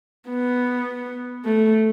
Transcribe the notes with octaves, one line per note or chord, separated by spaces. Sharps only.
B3
A3